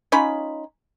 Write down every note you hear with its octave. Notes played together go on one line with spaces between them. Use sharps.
C#4 D#4 F4 B5